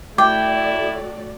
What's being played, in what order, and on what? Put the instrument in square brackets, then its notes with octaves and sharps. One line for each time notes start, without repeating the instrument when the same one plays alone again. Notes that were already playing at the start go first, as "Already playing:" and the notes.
[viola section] A3 F#4 D5 [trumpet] E4 [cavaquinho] G5 [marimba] D6